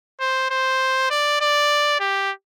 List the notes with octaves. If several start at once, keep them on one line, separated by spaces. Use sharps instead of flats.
C5
C5
D5
D5
G4